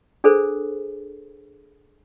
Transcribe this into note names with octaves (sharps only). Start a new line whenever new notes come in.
D4 G#4 A4 B4 C5